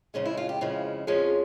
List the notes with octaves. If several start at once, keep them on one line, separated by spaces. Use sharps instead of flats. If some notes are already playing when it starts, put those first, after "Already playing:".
F2 C#3 F3 G#3 C#4
E4
F4
G4
F2 C#3 F3 G#3 E4
F2 C#3 F3 G#3 C#4